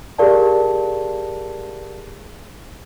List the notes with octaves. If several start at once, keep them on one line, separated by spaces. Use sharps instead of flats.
G4 G#4 A#4 D5 F5 A5